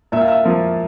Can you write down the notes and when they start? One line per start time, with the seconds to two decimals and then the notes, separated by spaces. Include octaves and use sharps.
0.12 A#2 E5
0.21 F5
0.28 E5
0.44 F3 A#3